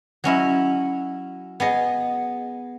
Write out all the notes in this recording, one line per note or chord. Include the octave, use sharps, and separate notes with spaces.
F#3 C#4 E4 D#5
B3 G#4 D#5